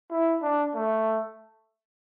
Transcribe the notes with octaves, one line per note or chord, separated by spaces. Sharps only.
E4
D4
A3